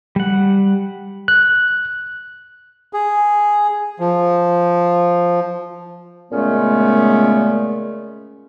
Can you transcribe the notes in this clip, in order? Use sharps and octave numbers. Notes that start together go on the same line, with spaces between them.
G3 F#5
F#6
G#4
F3
A#2 C#3 G#3 A3 B3 C#4